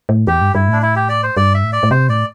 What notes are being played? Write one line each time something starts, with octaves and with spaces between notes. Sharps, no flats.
A2
E2 G4
G2
G2 E4
A2 D4
E4
G4
D5
C5
G2 D5
E5
A2
D5
A2
C3 C5
A2 D5